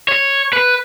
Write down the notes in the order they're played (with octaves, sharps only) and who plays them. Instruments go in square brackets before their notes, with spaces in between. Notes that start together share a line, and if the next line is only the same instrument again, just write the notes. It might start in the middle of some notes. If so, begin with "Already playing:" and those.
[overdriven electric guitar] C#5
B4